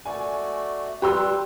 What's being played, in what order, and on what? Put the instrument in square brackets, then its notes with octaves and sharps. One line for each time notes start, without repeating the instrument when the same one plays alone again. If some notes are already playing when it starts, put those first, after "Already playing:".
[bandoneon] A3 F#4 D5 [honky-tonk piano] G#5
[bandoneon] G3 B4 [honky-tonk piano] G4 C6 E6